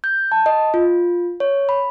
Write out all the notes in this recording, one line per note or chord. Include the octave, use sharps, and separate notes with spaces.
G6
A5
D#5
F4
C#5
B5